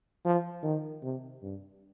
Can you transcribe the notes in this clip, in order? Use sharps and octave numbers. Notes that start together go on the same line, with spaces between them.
F3
D#3
C3
G2